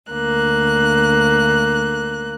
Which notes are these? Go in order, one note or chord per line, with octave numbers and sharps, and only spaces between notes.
D2 A#3 F#6